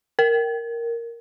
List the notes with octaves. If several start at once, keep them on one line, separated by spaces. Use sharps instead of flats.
A#4